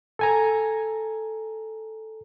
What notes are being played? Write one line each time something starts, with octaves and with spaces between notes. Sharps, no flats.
A4 G#5 A#5